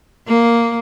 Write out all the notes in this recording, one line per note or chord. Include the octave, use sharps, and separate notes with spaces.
A#3